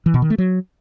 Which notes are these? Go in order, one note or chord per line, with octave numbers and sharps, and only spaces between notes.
E3
B2
D#3
A3
F#3